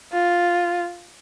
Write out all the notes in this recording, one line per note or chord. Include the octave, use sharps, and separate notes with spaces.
F4